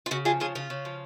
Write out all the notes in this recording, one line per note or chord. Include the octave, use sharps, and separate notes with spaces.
F4
C#3 F#4
F3 F4 G#4
C#3 F4 G#4
C#3 F4
C#3
F3